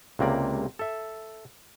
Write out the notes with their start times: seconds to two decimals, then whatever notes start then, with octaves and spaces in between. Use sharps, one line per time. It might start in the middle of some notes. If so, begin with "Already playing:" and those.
0.19 C#2 C3 A#3 D5
0.79 A4 E5